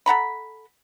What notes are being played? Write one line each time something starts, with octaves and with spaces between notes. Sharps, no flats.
A4 F#5 A#5 B5